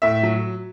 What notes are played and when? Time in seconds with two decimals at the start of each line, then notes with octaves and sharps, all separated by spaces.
0.02 A2 E5
0.23 F#3